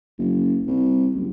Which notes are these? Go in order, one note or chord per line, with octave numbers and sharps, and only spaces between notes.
F#1
C2
F#1